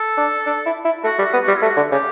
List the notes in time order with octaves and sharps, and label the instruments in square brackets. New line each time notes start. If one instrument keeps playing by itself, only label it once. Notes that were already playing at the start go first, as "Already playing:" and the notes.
Already playing: [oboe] A4
[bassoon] D4
D4
E4
E4
[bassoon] A3 [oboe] F#4
[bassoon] G3
[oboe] F#4
[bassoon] B3
[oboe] F#4
[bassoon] G3
[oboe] E4
[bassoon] A3 [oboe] F#4
[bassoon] D3
[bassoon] C#3 [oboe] G4